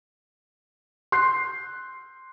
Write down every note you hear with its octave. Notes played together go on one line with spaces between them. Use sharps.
C6 F#6 G6 C7